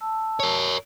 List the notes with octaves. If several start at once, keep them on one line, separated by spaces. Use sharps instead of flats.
A5 E6
A#4 C#5